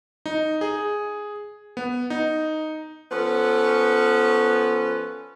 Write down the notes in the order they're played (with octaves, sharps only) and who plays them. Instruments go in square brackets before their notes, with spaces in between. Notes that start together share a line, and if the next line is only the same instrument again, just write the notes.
[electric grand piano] D#4
G#4
B3
D#4
[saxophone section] F3 B3 C#4 A4 B4